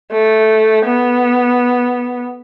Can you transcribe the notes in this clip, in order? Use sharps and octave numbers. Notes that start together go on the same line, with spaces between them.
A3
B3